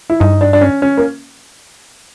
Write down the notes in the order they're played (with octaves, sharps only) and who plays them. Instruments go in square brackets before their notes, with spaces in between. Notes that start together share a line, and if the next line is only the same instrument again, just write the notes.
[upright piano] E4
[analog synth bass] G2 [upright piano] D#4
[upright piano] D4
D4
C#4
C#4
A#3